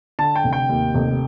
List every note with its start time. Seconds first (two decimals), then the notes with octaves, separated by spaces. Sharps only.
0.19 D3 A5
0.35 G5
0.44 F1
0.53 G5
0.69 D#2
0.95 F1